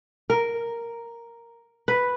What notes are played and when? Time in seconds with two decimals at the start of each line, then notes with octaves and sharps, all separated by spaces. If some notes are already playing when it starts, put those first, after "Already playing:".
0.30 A#4
1.88 B4